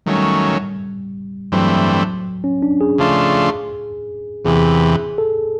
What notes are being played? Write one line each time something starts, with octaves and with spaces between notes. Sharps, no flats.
D#3 F#3 G3 A3 C#4
G2 E3 F#3 A3 C4
C#4
D4
G#4
C#3 F3 A3 D4 F4
E2 C3 E3 G#4
A4